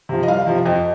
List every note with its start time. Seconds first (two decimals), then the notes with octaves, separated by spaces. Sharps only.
0.09 C3 F3
0.23 D#5
0.28 C2 F5
0.46 C3 F3
0.66 F2 D#5